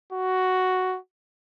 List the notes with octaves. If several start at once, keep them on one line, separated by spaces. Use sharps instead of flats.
F#4